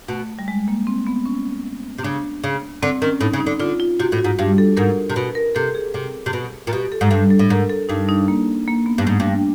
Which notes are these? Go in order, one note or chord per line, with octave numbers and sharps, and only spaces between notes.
B2 A3
G3
G#3
A#3
C4
B3
C#4
C3
C#3 D4
C#3
D3 C4
D#3 C#4
A2 D#4
C#3
D#4
D3
D3 F4
F4
C3 F#4
A2
F#4
G#2
G2 G4
A4
G#2 A#4
C3
B2 B4
A#4
C3 A4
G#4
C3
C3
B2
A#2
B2 G4
A4
G#2
G2 A4
A4
A2
G#2 A#4
A4
G2 D#4
D#4
A#3
A#3
B3
G2
G#2 A3
G2
G3